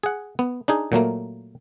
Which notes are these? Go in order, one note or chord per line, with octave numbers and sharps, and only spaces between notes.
G#4 F#5
B3
D4 D#4 G#4
A#2 F#3 A3 A#3